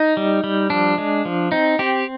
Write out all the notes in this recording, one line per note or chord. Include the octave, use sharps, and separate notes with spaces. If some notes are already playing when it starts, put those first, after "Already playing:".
Already playing: D#4
G3
G3
F3 D4
G#3
F3
C4 D#4
C4 G4